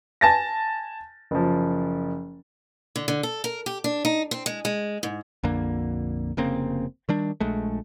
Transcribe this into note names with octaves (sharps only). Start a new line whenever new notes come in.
G#5 A5 A6 A#6
F#1 F3
D3
D3
A4
A#4
G4
D4
D#4
C4
G#3
G#3
G#2
A#1 F2 D3 A#3
F1 C#3 A#3 C4
D#3 G3 D4
A#1 G#3 A3